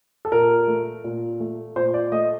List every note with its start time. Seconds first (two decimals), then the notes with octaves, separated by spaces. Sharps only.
0.25 A4
0.32 A#2 A#4
0.68 A3
1.04 A#2
1.40 A3
1.76 A#2 C5
1.94 D5
2.12 A3 D#5